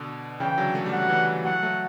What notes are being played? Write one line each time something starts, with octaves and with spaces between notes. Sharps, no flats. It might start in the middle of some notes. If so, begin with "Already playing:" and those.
Already playing: B2 D3
C#3 E3 G5
D3 F#3
A3
G3
F#5
F#3
E3 G3
F#3 A3 F#5
F#3 A3